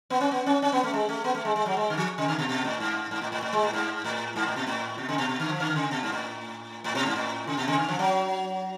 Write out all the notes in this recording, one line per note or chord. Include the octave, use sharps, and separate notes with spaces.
B3
C#4
B3
C#4
C#4
B3
A3
G#3
A3
B3
A3
G#3
G#3
F#3
G#3
D3
F3
C#3
D3
B2
B2
A2
G#2
G#2
A2
A2
A2
G#3
A2
G#2
A2
G#2
A2
B2
A2
B2
C#3
B2
B2
D3
F3
D3
C#3
B2
G#2
A2
A2
B2
G#2
A2
C#3
B2
C#3
D3
F3
F#3